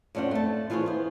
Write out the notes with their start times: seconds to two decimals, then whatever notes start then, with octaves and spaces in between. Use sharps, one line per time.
0.15 F2 C#4 D4 C5 F#5
0.31 A3 A5
0.70 E3 F4 G#4 C5 C#5
0.86 B3 C5